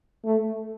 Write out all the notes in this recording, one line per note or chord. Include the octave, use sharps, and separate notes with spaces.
A3